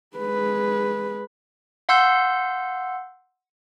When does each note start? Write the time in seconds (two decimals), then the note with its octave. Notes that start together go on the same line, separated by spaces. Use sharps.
0.17 G#3 B4
1.89 F5 F#5 C6 E6 G6